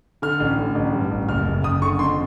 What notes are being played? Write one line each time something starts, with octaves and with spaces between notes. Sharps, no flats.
D3 F6
A1
D3
A1
G2
A1
F#1 F6
F#1
F#1 D#6
D3 C#6
F2 C6